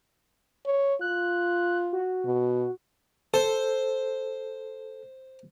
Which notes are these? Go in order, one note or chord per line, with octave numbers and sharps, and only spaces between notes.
C#5
F4 F#6
F#4
B2
A4 C5